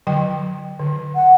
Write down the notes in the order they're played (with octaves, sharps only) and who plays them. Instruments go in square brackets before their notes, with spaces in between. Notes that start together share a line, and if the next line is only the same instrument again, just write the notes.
[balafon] D3 F#3 G5
D3
[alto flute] F#5